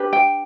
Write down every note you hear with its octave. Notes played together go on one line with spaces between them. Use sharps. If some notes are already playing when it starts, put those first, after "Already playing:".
Already playing: D4 G4 B4
G5